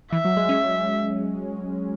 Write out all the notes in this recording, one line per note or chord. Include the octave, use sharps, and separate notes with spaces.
E3 E5
F#3
G#3
C#4